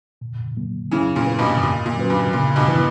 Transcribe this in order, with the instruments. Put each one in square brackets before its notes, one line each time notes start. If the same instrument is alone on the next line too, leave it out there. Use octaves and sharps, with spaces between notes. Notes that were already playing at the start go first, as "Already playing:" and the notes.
[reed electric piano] A#2
F#3 A#3
[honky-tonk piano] C#3 E3 [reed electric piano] F#3
[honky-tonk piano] A#2 C#3
[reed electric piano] A#3 E4 B4
[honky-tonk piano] G2 B2
[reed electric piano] G2 [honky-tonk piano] A#2
[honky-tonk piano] A#2
[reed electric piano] F#3 C#4 F#4 B4
[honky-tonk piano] G2
[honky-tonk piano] A#2 [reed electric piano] C#3
[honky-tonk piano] G2 B2
[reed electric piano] E3 B3 E4 B4